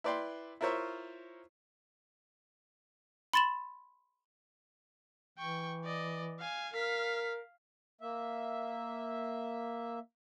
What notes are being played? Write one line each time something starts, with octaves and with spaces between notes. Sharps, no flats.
E4 B4 D5 G5 C6
E4 F4 A#4 C5 C#5 E5
B5 C6 A6 E7 F#7
E3 G5 C#6
D5 D#5
F5 G#5
A#4 F5 B6
A#3 E5